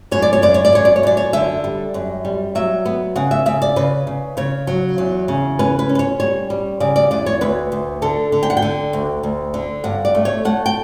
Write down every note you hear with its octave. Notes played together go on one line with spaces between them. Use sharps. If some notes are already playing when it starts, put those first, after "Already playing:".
F#2 C#5
D5
C#5
F#2 D5
C#5
D5
F#2 C#5
D5
C#5
F#2 D5
C#5
D3 E5
G3
F#2
G3
F#3 E5
B3
C#3 F#5
E5
C#3 E5
D5
C#3 B4
C#3
C#3 C#5
F#3
E2
C#3
C#4 B4
B4
C#4
B4
C#5
G3 C#5
G3
C#3 D5
D5
E2 D5
C#5
D2 B4
D2
D3 A4
D3
G5
F#5
G5
D3
D2
D2
D3
G2 F#5
D5
A3
C#5
A3 F#5
G5